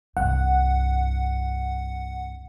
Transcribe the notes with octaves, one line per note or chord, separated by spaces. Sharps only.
C2 G2 F#5